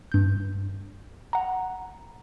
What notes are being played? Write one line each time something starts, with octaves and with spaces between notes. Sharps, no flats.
G2 G6
F#5 A#5